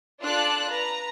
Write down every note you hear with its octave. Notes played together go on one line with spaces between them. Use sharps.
D4 F4 A4 D5 F#6
B4 A#5